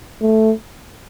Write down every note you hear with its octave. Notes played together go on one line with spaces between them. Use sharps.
A3